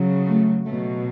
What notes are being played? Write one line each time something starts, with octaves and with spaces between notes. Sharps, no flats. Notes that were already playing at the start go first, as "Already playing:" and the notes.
Already playing: C#3 F#3
A3
B2 F#3 A3